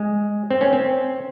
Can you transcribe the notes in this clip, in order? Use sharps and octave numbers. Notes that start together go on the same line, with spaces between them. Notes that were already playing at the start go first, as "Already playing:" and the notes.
Already playing: G#3
C4
C#4
C4